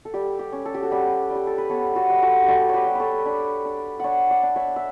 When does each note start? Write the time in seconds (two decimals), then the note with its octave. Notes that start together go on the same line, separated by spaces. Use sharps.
0.05 A4
0.14 G3 G4
0.39 G4
0.53 C#4
0.65 A4
0.74 G4
0.83 F#4 A4
0.91 G3 G4 B4
1.30 G3 G4
1.47 A4
1.58 B4
1.69 B3 A4 C#5
1.96 F#4 A4
2.09 G3
2.22 F#4 A4
2.44 G3 F#4 G4 A4
2.69 G4 B4 C#5
2.87 G3
2.95 A4 B4 C#5
3.26 D4
3.65 D4
4.00 D4 C#5 E5 F#5
4.31 D5 F#5
4.43 D4
4.56 C#5 E5
4.76 E5